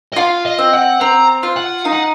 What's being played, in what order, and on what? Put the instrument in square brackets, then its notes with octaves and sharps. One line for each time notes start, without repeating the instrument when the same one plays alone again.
[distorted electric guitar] D#5
[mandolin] F4 [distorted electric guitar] F5
[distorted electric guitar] D#5
[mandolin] C4
[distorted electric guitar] F#5
[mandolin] C4 [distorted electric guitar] A#5
[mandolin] F4
[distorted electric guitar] F#5
[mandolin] D#4 [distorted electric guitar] F5
[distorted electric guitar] F#5